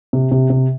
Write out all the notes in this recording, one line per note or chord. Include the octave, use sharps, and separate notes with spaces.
C3
C3
C3